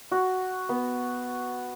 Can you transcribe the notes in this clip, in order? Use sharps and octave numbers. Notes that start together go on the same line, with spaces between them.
F#4
B3